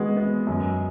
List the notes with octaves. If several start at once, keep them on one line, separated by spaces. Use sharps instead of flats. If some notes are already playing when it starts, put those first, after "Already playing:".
Already playing: E3 G#3 B3 F#4
B3
F#2